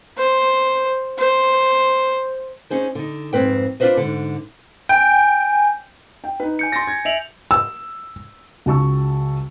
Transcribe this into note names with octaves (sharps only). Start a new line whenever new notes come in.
C5
C5
C#4 D#4 G#4 C5
D3 D#4
F2 G#2 C3 C4 B4 G5
D4 F4 G#4 B4 C5 D#5
G#2 D3
G5 G#5
G5
D#4 B4
G#5 G6 C#7
C6 A6 A#6
G#6
E5 D7 F7 F#7
E6
C#2 F#4 A5 C#6 E6